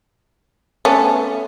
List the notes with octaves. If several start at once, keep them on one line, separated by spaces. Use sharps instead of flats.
A3 B3 C#4